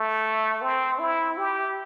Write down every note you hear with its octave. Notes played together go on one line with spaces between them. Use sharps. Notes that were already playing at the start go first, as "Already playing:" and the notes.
Already playing: A3
C4
E4
G4